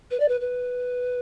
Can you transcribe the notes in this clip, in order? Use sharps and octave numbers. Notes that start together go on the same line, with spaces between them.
B4
D5
B4
B4